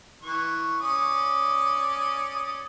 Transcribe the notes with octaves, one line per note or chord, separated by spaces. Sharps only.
E3 C#6
C#4 D5 D#6